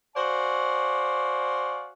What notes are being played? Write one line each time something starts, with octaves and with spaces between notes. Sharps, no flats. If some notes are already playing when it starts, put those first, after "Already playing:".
F#4 C5 D5 F5 G#5